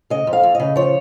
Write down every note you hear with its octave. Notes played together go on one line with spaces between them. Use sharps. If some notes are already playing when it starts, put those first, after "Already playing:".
C#3 D#5
F2
F5
F2
C#3 D#5
F3 C#5